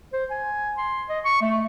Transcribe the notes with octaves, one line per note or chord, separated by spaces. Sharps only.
C5
G#5
C6
D#5
C#6
A3